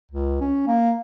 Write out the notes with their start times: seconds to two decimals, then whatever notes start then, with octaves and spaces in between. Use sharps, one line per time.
0.11 C#2
0.41 C#4
0.67 A#3